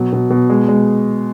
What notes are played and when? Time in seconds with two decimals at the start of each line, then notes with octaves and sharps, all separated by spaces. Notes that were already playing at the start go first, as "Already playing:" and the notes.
Already playing: B2 F#3
0.12 B2
0.30 B2
0.50 G#3
0.68 G#3